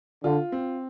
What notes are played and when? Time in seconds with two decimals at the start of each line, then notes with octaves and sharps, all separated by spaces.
0.24 D3 F4
0.52 C4